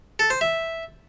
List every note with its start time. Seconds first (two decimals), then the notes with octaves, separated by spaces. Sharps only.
0.19 A4
0.30 C5
0.41 E5